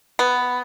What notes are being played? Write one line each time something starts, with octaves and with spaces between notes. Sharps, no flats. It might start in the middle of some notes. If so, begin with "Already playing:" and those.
B3